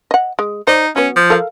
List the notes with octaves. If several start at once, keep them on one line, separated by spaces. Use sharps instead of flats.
D#5 F#5
G#3
D#4 C5 D5
F#3 B3 C#4
F3
A4 A#4 F5